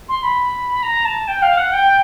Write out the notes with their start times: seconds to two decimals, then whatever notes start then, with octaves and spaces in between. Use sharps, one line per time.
0.09 C6
0.23 B5
0.83 A#5
1.05 A5
1.28 G5
1.42 F5
1.57 F#5
1.73 G5